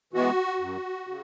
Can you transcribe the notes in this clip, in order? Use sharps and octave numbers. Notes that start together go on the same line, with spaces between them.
E3 G#3 B3 F#4
F#2
C#3